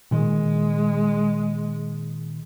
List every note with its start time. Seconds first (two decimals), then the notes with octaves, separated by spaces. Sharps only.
0.11 A#2 D#3 G#3